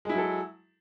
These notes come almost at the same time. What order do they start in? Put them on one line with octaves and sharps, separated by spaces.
G#3 E4 F#3 A4